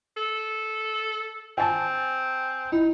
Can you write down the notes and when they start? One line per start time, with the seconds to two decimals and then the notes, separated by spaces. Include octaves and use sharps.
0.17 A4
1.58 C4 G#5 A5
2.72 D#4 E4